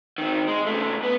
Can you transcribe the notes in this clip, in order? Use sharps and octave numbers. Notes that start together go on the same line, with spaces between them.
D#3 C4
G#3
C#3 A3
B3